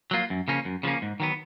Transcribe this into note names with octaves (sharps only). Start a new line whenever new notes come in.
F#3 A#3 F4
F#2
C#3 F3 A#3 C#4
F#2
C#3 F3 A#3 C#4
G#2
D#3 F#3 B3